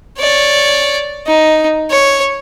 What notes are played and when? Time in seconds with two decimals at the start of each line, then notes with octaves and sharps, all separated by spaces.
0.19 C#5 D5
1.27 D#4
1.91 C#5